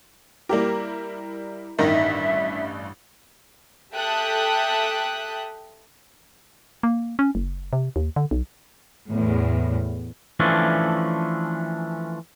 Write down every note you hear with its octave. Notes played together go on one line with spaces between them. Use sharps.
G3 A#3 E4 G4 A#4
A1 G2 D#3 E5 A#6
G4 A4 E5 G5 D#6 F#6
A#3
C#4
F#1
C3
D#2
D3
B1
E2 A2
E3 F3 A3 C#4 D4